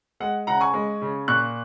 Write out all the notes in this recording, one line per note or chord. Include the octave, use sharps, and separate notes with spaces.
G#3 F#5
C#3 F#5 A#5
G#5 C#6
G#3
C#3
A#2 C#6 F#6